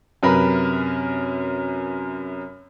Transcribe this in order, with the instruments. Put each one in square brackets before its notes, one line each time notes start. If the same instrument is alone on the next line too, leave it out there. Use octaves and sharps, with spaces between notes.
[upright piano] F#2 C3 A#4 B4 B5